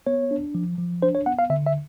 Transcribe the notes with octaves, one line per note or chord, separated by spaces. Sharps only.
B3 C#5
D4
F3
F3
D4 C5
C#5
B3 F#5
F5
D3 E5
E5